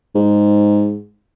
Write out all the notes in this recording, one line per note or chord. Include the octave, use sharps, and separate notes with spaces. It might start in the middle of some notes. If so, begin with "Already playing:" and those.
G#2